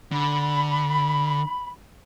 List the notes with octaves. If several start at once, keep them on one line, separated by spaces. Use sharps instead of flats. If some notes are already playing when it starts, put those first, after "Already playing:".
D3 B5